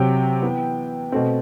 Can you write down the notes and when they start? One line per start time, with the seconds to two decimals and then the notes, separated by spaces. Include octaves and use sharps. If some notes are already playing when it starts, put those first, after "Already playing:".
Already playing: C3 F#3 C4 G5
0.42 E3 B3
1.12 B2 A3 C4